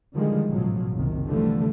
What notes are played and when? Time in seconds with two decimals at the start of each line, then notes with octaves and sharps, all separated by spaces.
0.14 D3 D#3 F3 G3 G#3
0.48 A1 G#2 B2 F3 F#3
0.94 F#1 C2 C3 D#3
1.25 D3 E3 F3 G3 A3